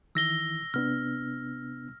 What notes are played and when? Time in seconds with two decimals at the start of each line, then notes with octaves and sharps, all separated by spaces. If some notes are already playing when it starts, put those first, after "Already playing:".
0.15 D#3 E3 E4 E6 A#6 G7
0.74 C3 B3 D4 F6